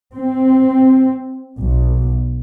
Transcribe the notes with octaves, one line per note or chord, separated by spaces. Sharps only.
C4
B1